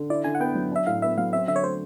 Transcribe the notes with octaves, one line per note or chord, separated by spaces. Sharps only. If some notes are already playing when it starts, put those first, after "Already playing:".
Already playing: D3
E4 D5
D3 G#5
F#5
B3 G5
F#3
D4 E5
A2 F5
B3 E5
F#3 F5
C4 E5
D3 E5
C#5
A3 C5